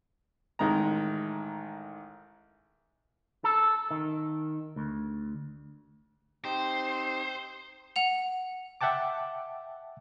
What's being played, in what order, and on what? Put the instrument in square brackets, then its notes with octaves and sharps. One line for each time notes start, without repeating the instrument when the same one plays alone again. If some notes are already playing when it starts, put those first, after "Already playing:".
[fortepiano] A1 D#3 G#3 A#5
[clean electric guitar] A4
D#3
D2
[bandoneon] C4 D#4 G4 [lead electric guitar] C5
[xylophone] F#5 F7
[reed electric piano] E5 F#5 G5 A5 D6